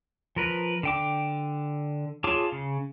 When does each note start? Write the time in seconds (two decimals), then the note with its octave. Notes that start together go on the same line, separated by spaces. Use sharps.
0.36 F3 A#4 B4
0.83 D3 G5 D6
2.24 F4 G#4 C#5 A5 D6
2.52 C#3